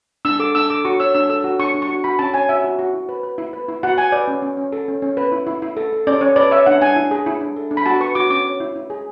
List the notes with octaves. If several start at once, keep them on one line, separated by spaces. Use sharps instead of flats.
D4 E6
A4 D6
D4 E6
A4 D6
F#4 C#6
C#5 E6
D4 E6
A4 E6
F#4
D4 C#6
D4
C#6
F#4
F#4 B5
C#4 A5
C#5 G#5
F#4 E5
F#4
F#4
E4
B4
B4
E4
B4
E4
F#4 F#5
F#4 G#5
B4 D5
C#4
C#4
C#4
A4
C#4
C#4
B4
E4
E4
E4
A4
A4
C#4 D5
C#4 C#5
B4 D5
C#5 E5
D4 F#5
D4 G#5
E4
G#4
E4
D4
A4
D4
B5
F#4 A5
B4 C#6
F#4 D6
C#4 D6
C#5
E4
E4
G#4